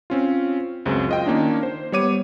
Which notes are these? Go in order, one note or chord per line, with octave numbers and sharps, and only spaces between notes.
C4 C#4 F4
C#2 F#2 C4 G#4
F4 D#5 G5
D#3 A#3 C#4 D4
C5
G3 B3 C#5 D6 D#7